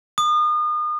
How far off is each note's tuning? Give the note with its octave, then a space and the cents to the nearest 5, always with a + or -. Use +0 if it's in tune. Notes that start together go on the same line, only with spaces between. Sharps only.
D#6 -35